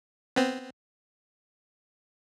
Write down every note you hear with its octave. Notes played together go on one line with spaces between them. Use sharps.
B3 C4